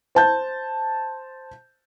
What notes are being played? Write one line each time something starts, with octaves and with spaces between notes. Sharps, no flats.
C5 A5 G6